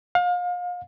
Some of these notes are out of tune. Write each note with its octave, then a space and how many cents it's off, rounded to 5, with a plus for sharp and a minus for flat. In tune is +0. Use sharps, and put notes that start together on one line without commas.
F5 +35